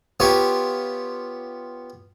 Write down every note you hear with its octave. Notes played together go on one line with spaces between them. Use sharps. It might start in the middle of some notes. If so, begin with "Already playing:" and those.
B3 F4 G4 C#5